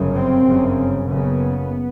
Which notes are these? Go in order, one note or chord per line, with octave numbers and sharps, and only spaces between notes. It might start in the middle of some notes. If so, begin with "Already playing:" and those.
Already playing: G1 F#2 C#3
C4
G1 F#2 C#3
F#1 F#2 C#3 B3